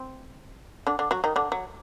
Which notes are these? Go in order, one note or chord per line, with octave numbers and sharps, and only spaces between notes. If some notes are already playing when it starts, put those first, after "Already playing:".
Already playing: C4
D3 D4
D3 D4
F#3 F#4
D#3 D#4
D3 D4
F#3